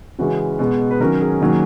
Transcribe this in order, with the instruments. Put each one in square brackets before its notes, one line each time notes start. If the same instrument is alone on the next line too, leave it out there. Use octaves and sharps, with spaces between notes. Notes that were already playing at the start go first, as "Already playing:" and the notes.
[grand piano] C#3 E3 G#3 C#4 F#4
B2 G#3 B3
B4
D#3 F#3 C#4 A#4
G#4
D#3 F#3 A#3 C#4